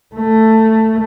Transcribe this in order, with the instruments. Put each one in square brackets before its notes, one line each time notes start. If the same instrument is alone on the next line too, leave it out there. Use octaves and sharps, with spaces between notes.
[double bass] A3